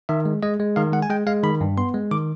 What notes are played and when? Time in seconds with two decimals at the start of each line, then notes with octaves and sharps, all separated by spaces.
0.09 D#3 E5
0.26 G#3
0.43 G#3 D#5
0.60 G#3
0.76 D#3 F5
0.93 G#3 F#5
1.02 G#5
1.10 G#3 G5
1.27 G#3 F5
1.43 D#3 B5
1.61 G2
1.77 B3 C6
1.94 G#3
2.11 D#3 D6